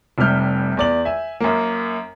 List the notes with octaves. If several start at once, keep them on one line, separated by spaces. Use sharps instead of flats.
F1 C3 G3 F6 G6
E2 D5 F#7
E5 G#5
F#2 A#3